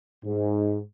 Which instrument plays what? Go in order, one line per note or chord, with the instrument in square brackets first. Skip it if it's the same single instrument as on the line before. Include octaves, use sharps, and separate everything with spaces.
[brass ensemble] G#2